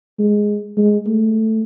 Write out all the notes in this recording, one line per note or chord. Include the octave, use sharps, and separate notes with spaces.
G#3
G#3
A3